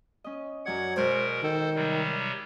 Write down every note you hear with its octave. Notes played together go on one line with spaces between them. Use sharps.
C#4 D#5
F#2 F#3 D5 F#5 G#6
B2 G#3 A#4 C5
D#3 A4 C5
C3 F#3 G3